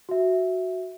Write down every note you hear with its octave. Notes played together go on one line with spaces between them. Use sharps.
F#4 E5